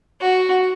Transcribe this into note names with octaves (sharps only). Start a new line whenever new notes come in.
F#4